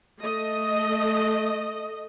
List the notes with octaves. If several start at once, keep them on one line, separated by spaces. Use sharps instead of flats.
A3 D#5